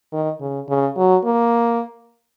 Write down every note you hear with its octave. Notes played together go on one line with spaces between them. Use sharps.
D#3
C#3
C#3
F#3
A#3